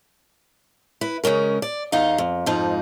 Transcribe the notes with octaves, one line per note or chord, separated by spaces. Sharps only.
E4 B4
C#3 G#3 C#4 A#4
D5
E2 D#4 D#5 F5
F2
F2 G#2 F3 D#4